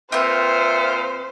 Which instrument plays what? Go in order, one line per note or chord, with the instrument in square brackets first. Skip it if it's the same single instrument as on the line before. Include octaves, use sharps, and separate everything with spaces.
[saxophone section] A#2 F4 [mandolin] C4 B4 [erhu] C5 [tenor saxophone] E5